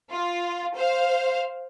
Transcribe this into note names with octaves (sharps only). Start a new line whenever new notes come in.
F4
C5 F5